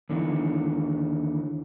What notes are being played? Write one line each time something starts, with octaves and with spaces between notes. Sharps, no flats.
D#2 D3 E3